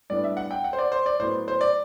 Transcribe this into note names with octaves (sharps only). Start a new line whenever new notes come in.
A2 G3 B3 D4 D5
E5
F#5
G5
F#5
C5
D5
C5
D5
A2 F#3 B3 C5
C5
D5